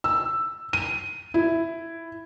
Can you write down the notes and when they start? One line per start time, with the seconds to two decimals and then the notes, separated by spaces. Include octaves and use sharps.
0.04 E6
0.73 D#7
1.34 E4